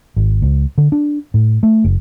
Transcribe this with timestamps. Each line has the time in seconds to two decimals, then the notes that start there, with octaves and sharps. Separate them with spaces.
0.17 G#1
0.42 C#2
0.78 D3
0.92 D4
1.34 A2
1.63 A3
1.84 F#1